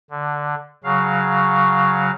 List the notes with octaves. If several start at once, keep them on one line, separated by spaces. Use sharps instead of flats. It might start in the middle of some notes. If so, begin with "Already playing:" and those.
D3
C#3 F#3 F5